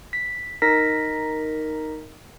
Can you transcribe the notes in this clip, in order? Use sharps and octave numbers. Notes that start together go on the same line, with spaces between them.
B6
D#4 A#4 A#6 B6